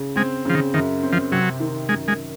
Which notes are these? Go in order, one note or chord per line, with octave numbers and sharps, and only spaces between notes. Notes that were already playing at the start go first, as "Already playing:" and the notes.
Already playing: C#3
G#3 C4
C#3 F3
D#3
F#2 D#3
C4
F3
C3 F#3
D#3
F#2 G#3
G#3